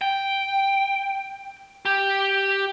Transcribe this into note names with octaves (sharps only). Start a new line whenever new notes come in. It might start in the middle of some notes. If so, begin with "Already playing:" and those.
G5
G4